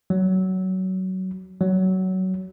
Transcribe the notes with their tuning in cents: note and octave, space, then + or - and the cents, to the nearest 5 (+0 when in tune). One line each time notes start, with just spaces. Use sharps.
F#3 +20
F#3 +20